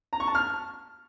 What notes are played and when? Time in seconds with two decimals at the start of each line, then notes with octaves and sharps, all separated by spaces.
0.13 A#5
0.20 C#6
0.27 A5
0.35 F6